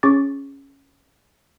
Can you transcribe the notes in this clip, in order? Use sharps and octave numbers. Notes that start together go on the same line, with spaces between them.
C#4 G#4 C#6 D6 A6